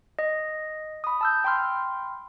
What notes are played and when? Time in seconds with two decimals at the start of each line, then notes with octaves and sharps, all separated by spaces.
0.19 D#5
1.04 B5 D#6
1.21 A5 E6 G6
1.44 G5 B5 C6 F6